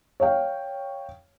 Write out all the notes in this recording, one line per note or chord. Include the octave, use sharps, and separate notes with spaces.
C#5 F5 G5